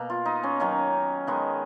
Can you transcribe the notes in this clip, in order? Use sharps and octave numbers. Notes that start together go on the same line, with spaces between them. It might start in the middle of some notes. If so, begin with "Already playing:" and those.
Already playing: B2 A#3
F4
D#4
C#4
D#3 F#3 A#3 C#4
D#3 G#3 B3